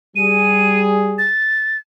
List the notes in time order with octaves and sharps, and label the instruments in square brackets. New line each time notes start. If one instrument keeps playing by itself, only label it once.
[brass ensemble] G3 G#4 [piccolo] D#7
[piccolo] A6